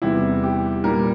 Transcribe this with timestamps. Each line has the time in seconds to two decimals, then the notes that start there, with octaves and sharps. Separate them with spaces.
0.02 E2 C3 E3 G3 E4
0.43 G4
0.84 A#2 G3 A#4